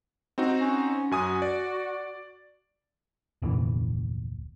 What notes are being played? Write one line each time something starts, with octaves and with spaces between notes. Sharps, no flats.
C4 D#4 F#4
C#4
F#2 F#4 G#5 D#6
D5
F1 D2 A#2 E3